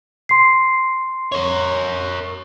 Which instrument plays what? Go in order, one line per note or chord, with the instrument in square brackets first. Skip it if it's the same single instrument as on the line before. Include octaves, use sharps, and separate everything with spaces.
[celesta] C6 C7
[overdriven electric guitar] A#4 C#5